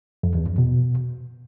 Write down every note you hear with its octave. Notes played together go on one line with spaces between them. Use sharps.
F2
E2
F#2
B2